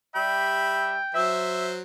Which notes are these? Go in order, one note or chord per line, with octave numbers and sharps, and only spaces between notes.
G3 E5 G5 B5
F#3 C5 E5